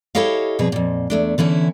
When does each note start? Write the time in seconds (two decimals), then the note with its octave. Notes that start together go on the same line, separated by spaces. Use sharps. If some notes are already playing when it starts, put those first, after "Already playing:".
0.15 E4 G4 A4 C#5 D#5 F5
0.59 F2 B2 G3 G#4 B4
0.72 F2 A#2
1.10 E2 A3 D4
1.38 D3 E3 C#4 E4